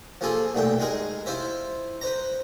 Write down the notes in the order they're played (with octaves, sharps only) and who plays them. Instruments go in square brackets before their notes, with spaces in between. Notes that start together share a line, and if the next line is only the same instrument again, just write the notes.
[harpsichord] F3 A#3 F4 G#4 A4
B1 A#2 A3 G5
G#3 D#4 G#4 A#4
E4 F4 C5 E5
B4 C5 A#5